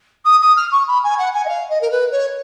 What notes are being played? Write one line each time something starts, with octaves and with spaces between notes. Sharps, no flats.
D#6
D#6
F6
C#6
B5
G#5
F#5
G#5
D#5
F5
D#5
A#4
B4
C#5